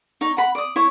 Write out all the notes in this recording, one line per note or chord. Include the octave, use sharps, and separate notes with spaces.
D#4 C#5
F#5 B5
D5 D#6
E4 C#5